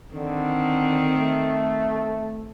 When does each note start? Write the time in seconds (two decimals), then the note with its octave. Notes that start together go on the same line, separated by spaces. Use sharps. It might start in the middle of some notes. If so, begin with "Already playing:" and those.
0.14 D3 D#3 C4
1.13 A3